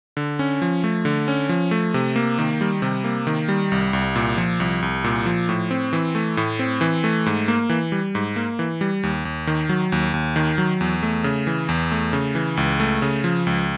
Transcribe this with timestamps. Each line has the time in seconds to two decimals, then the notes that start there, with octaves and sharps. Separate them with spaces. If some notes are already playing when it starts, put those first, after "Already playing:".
0.17 D3
0.39 C#4
0.62 F3
0.84 A3
1.05 D3
1.28 C#4
1.49 F3
1.71 A3
1.94 C3
2.16 A#3
2.39 D#3
2.61 G3
2.82 C3
3.04 A#3
3.27 D#3
3.49 G3
3.72 C2
3.93 C2
4.16 A#2
4.38 F3
4.60 C2
4.82 C2
5.04 A#2
5.26 F3
5.49 A2
5.71 C4
5.93 E3
6.15 A3
6.37 A2
6.59 C4
6.81 E3
7.04 A3
7.26 G#2
7.48 A#3
7.69 E3
7.92 G3
8.15 G#2
8.36 A#3
8.59 E3
8.81 G3
9.03 D#2
9.25 D#2
9.47 D#3
9.69 F#3
9.92 D#2
10.14 D#2
10.36 D#3
10.58 F#3
10.81 E2
11.03 A3
11.24 C#3
11.47 E3
11.69 E2
11.92 A3
12.13 C#3
12.35 E3
12.57 C#2
12.80 A3
13.02 C#3
13.24 F3
13.47 C#2